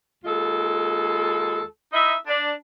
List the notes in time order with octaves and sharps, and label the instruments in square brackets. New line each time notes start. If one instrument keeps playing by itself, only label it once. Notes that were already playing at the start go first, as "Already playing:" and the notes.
[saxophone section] D#2 G#3 F4 A4
D#4 E4 D#5 E5
D4